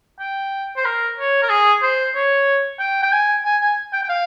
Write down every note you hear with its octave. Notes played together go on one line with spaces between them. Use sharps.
G5
C5
A#4
C#5
A#4
G#4
C5
C#5
G5
G5
G#5
G#5
G#5
G5
G5
F5